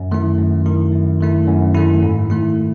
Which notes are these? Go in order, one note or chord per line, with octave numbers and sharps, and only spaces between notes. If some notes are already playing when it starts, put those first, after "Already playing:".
Already playing: F#2
D#3 A3 E4
F#2
D#3 A3 E4
F#2
D#3 A3 E4
F#2
D#3 A3 E4
G#2
D#3 A3 E4